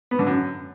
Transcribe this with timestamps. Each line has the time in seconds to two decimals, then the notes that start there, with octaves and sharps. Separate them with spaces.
0.11 B3
0.19 D3
0.27 F#2